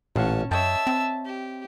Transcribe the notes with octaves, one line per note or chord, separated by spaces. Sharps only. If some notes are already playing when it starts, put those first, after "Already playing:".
A1 A#2 C#4 F5 F#5 A5
F#2 C#5 D#5 E5 G5 A5 E6
C4
G4